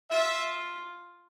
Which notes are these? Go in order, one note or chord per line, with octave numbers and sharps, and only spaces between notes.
F4 E5